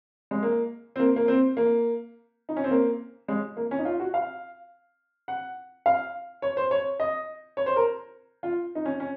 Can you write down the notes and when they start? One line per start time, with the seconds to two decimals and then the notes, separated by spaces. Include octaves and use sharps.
0.31 G#3
0.43 A#3
0.96 C4
0.99 A#3
1.16 A#3
1.28 C4
1.57 A#3
2.49 D#4
2.56 C#4
2.64 C4
2.71 A#3
3.28 G#3
3.57 A#3
3.71 C#4
3.79 D#4
3.85 F4
4.00 F#4
4.14 F5
5.28 F#5
5.86 F5
6.42 C#5
6.57 C5
6.71 C#5
7.00 D#5
7.57 C#5
7.66 C5
7.76 A#4
8.43 F4
8.75 D#4
8.85 C#4
9.00 C#4